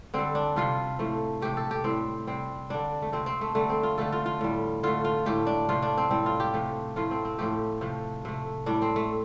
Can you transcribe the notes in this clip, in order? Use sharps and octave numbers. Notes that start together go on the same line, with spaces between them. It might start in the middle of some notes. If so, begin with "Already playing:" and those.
D3 G3 C4
D4
C3 G3 F4
A2 F3 A3
C3 A3 G4
A4
G4
A2 C4
G3
C3 G3 C4
D3 G3 D4
A3
C3 F3 A3 C4
C4
A3
D3 G3 A3
C4
F4
D3 F3 A3 A4
F4
F4
A2 G3
D3 A3 F4
F4
A2 A3 G4
D4
C3 F3 A3 F4
D4
C4
A2 G3 C4
F4
G4
C3 F3 A3
A2 F3 A3 F4
C4
C4
A2 F3 A3 G4
C3 F3 A3
C3 A3
A2 G3 D4
C4
A3